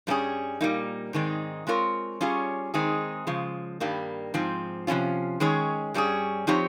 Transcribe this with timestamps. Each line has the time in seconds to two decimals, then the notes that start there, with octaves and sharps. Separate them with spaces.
0.07 G2 G3 A#3 C#4 G#4
0.61 A#2 G3 A#3 D#4
1.13 G#2 D#3 G#3 C4 D#4
1.67 G#3 C4 F4 A#4 C#5
2.21 G3 C#4 F4 G#4 C#5
2.74 D#3 G#3 C4 D#4 G#4
3.27 C#3 F3 G#3
3.80 G2 D#3 G3 A#3
4.34 G#2 F3 C4
4.87 C3 F3 G#3 C#4 F4
5.40 D#3 G#3 C#4 G#4 C#5
5.94 G2 G3 C#4 G#4
6.47 F3 C4 D#4 G4 C#5